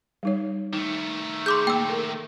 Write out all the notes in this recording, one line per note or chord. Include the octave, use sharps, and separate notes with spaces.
G3 D#4 C#5
D#3 A3 D#4
G#4 C6 D6 G6
A#3 G5 E6
A4 A#4